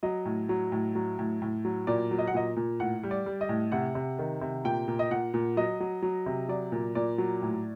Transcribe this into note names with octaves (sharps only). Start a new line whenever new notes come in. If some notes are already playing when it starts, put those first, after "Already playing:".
F#3 D#5
A2
F#3
A2
F#3
A2
A2
F#3
A#2 D5
F#3
D#5
F#5
A#2 D#5
A#2
A2 F#5
G3
D5
G3
D#5
A2
C3 F#5
C3
D#3
C3
A#2 G5
A#2
D#5
A#2 F#5
A#2
F#3 D#5
F#3
F#3
C3
F#3 D5
A#2
A#2 D5
F#3
A2